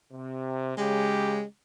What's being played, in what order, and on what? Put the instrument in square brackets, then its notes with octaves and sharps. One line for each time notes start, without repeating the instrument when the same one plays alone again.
[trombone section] C3
[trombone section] C#3 G4 [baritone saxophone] G#3